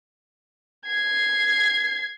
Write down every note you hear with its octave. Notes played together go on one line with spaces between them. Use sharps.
G#6 C7